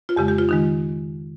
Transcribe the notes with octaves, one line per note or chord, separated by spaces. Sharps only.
F4
F2 C#3 G#3 G4
G4
F4
D#3 G#3 D#4